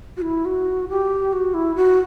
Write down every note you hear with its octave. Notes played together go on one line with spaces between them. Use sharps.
F#4
E4
F#4
G4
F#4
E4
F#4